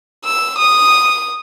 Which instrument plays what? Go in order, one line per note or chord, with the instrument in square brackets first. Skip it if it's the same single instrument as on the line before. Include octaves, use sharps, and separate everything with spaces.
[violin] E6
D#6